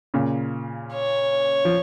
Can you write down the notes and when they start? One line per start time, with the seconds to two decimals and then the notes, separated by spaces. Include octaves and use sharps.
0.14 A#2 C#3
0.93 C#5
1.65 F3